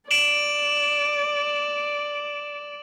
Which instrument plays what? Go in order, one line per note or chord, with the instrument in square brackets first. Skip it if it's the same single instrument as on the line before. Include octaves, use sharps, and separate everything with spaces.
[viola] D5 [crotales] D7 E7 F#7